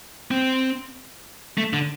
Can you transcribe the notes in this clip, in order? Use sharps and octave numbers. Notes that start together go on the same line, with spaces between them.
C4
A3
D3